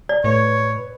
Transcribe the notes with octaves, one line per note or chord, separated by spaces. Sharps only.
D5
A2 B4 C#5